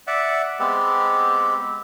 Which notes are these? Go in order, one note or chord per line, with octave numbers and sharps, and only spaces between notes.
D5 E5 F#5
G#3 B3 C4 G4